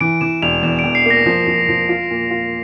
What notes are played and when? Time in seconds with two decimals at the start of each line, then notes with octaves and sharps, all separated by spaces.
0.01 E3 D7
0.21 E3 E7
0.42 E1 F7
0.63 E2 E7
0.79 D7
0.84 E2
0.95 C7
1.05 A#3
1.10 A#6
1.26 F3
1.47 F3
1.69 F3
1.89 F4
2.11 A#2
2.31 F4